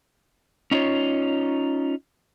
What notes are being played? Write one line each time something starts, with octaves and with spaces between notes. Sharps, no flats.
C#4 D#4 F4 C#5